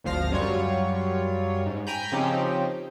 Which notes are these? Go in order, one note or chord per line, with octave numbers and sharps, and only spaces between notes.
G#1 D2 F3 F5 F6 A#6
F#2 F#3 G3 F4 C#5
G#2
G5 G#5 A#5 B5 G6
C#3 F3 C4 C#4 D#4 G4